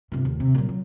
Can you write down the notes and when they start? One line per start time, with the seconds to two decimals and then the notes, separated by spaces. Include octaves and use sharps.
0.12 G1 C3
0.25 D#2 A2
0.40 C3
0.55 A#2 F#3
0.69 F#3